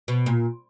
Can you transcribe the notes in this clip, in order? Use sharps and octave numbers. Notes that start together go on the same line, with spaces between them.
B2
A#2